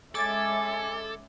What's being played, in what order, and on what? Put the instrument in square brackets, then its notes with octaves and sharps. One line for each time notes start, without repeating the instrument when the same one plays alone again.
[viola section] G#3 C#4 E5 [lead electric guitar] A4 [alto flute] G#5 [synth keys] D6 G#6 A6